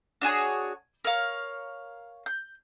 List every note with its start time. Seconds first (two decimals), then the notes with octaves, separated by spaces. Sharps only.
0.22 D4 F#4 G#4 C#5
1.05 A#4 C#5 F5
2.26 G6